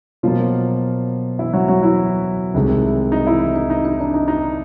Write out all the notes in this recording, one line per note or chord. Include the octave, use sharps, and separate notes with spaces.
B2 F3 F#3 A#3 F4
E3 E4
F#3 F#4
F#3 F#4
E3 E4
C2 C3 D#3 G#3
D#4
E3 E4
D#4
D#4
D#4
D4
D#4
D#4